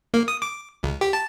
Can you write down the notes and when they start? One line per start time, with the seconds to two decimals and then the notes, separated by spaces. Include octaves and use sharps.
0.14 A#3
0.28 D#6
0.42 D6
0.83 C#2
1.01 G4
1.13 A5